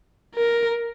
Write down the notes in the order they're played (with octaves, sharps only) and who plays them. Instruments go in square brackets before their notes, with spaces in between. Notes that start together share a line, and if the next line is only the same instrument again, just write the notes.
[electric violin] A#4